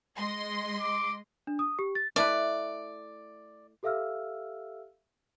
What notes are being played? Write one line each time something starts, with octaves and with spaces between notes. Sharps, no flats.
G#3 D#5 C6
D6
D4
D#6
G4
A6
A3 E4 B4 D5
G4 A4 E5 F5 E6 F6